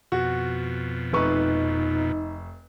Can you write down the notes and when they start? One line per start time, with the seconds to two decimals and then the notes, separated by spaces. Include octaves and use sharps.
0.12 F2 B2 F#4
1.13 F1 D#4 B4 C#6